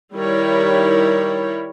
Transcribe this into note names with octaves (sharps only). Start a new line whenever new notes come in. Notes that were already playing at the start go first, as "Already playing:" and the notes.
D#3 G3 E4 A#4 C#5